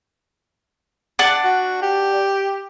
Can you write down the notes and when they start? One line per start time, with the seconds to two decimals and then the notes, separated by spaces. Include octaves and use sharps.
1.19 D4 F#5 A5
1.44 F#4
1.82 G4